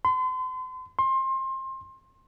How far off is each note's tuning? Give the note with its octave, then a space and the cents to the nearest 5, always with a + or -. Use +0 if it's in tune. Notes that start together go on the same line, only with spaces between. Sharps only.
C6 -40
C6 +25